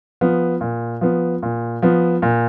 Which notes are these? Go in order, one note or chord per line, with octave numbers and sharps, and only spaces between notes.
F3 B3
A#2
F3 B3
A#2
F3 B3
A#2